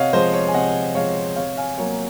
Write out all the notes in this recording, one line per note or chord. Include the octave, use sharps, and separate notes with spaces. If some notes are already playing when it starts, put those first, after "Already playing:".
Already playing: C3 C#5 D#5 F5 F#5
F3 G#3 C5 D#5
C#5
G#5
C3 D#5 F#5
F3 G#3 C#5 F5
C3 C#5 F5
F5 G#5
F#3 A#3 C#5